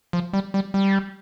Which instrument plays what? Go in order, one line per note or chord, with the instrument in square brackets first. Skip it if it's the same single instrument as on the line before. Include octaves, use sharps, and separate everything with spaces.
[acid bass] F3
G3
G3
G3